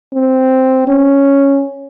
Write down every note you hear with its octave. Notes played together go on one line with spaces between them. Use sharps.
C4
C#4